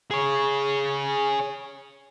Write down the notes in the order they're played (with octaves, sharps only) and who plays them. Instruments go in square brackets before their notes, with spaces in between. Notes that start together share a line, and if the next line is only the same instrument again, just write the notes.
[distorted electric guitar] G#4 C#5